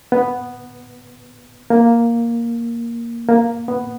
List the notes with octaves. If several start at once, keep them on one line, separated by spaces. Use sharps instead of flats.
B3
A#3
A#3
B3